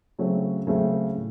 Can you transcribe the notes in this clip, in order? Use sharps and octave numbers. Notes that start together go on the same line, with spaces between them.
C#3 F#3 A3 C4
C#3 F#3 A3 C4
A2